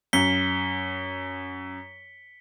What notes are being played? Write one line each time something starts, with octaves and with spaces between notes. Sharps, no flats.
F#2 B6 C#7 G7